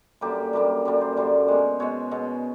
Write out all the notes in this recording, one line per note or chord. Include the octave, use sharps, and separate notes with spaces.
F#2 D3 G3 A#3 G4
F#2 D3 G3 A#3
F#2 D3 G3 A#3
C5
F#2 D3 G3 A#3
B2 G#3
B2 G#3 C#5
B2 G#3